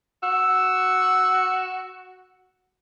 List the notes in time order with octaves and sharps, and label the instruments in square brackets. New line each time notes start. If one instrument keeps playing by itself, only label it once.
[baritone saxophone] F#4 [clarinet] E6